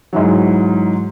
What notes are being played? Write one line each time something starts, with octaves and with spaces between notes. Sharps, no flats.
G#2 E3 F#3